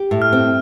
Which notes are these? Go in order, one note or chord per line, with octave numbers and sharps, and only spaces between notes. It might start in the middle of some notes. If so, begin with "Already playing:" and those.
Already playing: G4
A2
F6
C4